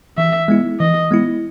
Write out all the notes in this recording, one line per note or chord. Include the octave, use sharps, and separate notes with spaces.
E3 E5
G#3 B3 E4
E3 D#5
G#3 B3 E4